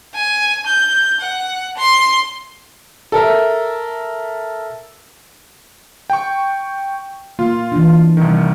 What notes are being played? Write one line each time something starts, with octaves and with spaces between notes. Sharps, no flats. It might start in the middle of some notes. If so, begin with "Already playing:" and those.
G#5
G6
F#5
C6
A4 A#4 E5
G5 C#6
A#3 F4
E3 D4
C2 D#3